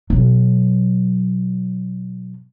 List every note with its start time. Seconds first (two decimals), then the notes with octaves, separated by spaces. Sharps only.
0.10 B2 F#3